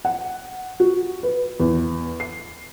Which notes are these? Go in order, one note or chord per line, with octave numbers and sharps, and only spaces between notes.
F#5
F#4
B4
E2
C7